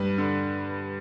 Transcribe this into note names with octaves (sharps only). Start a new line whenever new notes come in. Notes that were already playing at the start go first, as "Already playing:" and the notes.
Already playing: G2 B4
D3